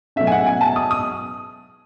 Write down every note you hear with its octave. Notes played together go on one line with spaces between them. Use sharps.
B2 F#3 A3 C#4 E5
G#5
F#5
G#5
A5
D#6
D#6